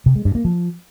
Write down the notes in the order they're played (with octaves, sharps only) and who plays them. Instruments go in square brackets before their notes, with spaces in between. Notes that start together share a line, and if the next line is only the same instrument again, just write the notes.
[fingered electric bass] C3
G#3
G2
A#3
F3